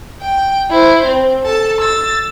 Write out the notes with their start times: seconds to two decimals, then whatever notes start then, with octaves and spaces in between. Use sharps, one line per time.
0.22 G5
0.70 E4 C5
1.06 C4
1.43 A4 A5
1.81 E6 A6